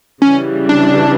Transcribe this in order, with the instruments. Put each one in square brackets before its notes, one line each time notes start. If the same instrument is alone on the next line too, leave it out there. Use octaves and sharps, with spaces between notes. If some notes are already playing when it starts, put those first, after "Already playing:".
[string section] C#3 E3 G3 [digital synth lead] C#4
[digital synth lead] D4